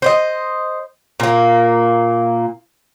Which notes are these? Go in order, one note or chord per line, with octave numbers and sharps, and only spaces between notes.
C5 D5 D#5
A#2 A#3